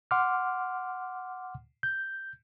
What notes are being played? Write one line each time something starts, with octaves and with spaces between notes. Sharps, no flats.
F#5 C6 D6 F6
G6